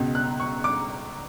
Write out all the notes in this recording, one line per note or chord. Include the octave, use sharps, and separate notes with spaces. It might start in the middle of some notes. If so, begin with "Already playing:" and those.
Already playing: C#2 B2
F#6
C#6
D6